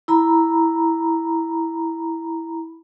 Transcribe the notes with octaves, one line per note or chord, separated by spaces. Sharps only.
E4 A#5 B5